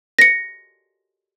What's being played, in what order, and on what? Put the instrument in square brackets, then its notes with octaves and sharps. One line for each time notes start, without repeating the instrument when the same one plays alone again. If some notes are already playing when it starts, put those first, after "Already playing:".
[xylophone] A#6 C#7